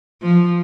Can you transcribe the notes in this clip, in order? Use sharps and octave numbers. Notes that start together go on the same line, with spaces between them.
F3